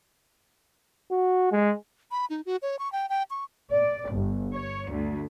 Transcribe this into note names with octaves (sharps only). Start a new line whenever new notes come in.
F#4
G#3
B5
D#4
F#4
C#5
C#6
G5
G5
C#6
D5
G1
C#5
D2